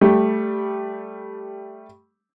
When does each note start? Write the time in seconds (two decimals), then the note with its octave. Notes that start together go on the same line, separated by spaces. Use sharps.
0.01 G3 A3 G4